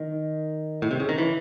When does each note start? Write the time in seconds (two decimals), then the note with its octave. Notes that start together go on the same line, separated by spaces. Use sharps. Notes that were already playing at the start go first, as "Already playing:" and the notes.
Already playing: D#3
0.82 A2
0.91 C3
1.00 C#3
1.09 D#3
1.18 E3